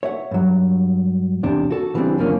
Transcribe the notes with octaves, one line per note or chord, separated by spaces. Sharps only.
C#5 E5 F#5
G2 F#3
E2 C3 D4
F#4 A4
C#3 E3 G3 G#3 C4 D4
C#2 F#2 D3 F3 A#3 C#4